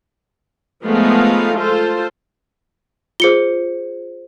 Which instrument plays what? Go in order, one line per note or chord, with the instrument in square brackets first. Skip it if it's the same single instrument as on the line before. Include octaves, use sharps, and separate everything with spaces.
[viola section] F3 G#3 A3 B3 D#4 F5
F4 A4 C5
[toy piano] F4 G#4 [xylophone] C5 C#7 G7